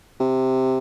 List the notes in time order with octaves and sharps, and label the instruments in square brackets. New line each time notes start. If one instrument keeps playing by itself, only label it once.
[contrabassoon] C3